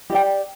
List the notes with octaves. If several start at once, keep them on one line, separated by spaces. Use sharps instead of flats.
G4 D5 G5